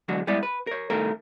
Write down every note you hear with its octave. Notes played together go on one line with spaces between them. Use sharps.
E2 D3 F#3 G#3 F#4
G3 G#3 B3 E4 D5
B4
A#4 C#5
C2 A2 D#3 A3 A4 A#4